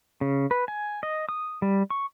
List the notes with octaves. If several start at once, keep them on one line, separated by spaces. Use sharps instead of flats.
C#3
B4
G#5
D#5
D#6
G3
C#6